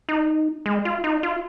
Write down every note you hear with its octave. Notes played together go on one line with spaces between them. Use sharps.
D#4
G#3
F4
D#4
F4